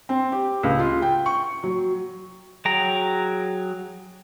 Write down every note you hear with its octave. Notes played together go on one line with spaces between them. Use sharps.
C4
G4
C#2
F4
G5
C#6
F#3
F#3 G#4 G5 A#5